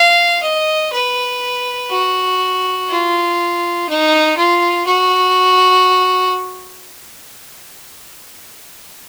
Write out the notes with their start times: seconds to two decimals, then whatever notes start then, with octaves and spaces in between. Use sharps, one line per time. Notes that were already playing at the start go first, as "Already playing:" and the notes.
Already playing: F5
0.42 D#5
0.93 B4
1.91 F#4
2.89 F4
3.89 D#4
4.37 F4
4.86 F#4